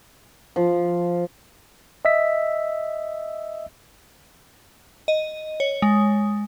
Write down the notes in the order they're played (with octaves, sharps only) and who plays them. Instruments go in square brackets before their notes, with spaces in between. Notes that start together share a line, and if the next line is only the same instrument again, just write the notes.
[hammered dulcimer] F3
[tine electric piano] D#5 E5 E6 B6
[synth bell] D#5
C#5
G#3